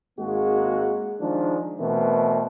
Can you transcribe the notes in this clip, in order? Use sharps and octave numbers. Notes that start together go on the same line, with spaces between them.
G#1 G#3 A#3 F#4 G#4
D#3 F3 G#3 D4
B2 E3 A3 C4 A#4